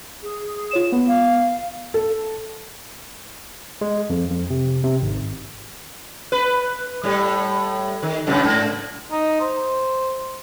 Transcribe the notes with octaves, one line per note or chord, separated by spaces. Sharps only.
G#4
F4 C#5 E7
B3
F5
A4
G#3
F2
F2
C3
C3
G#1
B4
A2 G3
D#3
F#2 A2 C#3
G#2
D#4
C5